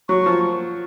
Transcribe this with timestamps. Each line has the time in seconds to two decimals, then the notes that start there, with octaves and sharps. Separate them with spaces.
0.09 F#3 C#6
0.26 F3